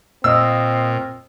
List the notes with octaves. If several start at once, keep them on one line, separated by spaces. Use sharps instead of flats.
A#2 A#3 C4 D#5 D#6 E6